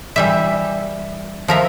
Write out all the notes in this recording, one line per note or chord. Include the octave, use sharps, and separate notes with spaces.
E3 G3 E5
F3 A#4 E5